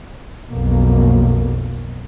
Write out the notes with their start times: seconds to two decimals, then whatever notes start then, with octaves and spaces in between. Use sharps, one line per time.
0.50 B1 F2 B2 A#3